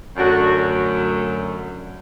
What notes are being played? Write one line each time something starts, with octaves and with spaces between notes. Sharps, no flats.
F#2 D3 F#3 A3 D4 F#4